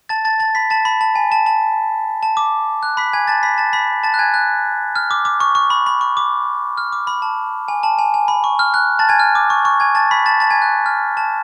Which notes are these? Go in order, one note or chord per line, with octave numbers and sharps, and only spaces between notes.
A5 A6
A5 A6
A5 A6
B5 B6
A5 A6
B5
A5
G#5
A5
A5
A5
D6
F#6
B5 B6
G#5 G#6
A5 A6
B5 B6
A5 A6
B5 B6
A5 A6
F#6
G#5 G#6
F#6
F6
D6
D6
C#6
C#6
B5
B5
C#6
D6
F6
D6
B5
A5
G#5
A5
G#5
G#5
B5
C#6
F6
F#6
A5 A6
G#5 G#6
F6
D6
C#6
C#6
G#5 G#6
A5 A6
B5 B6
A5 A6
A5 A6
G#5 G#6
F#6
F6
A5